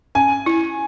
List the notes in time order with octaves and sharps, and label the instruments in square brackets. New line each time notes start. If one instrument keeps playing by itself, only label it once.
[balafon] C#4 [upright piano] G#5
[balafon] E4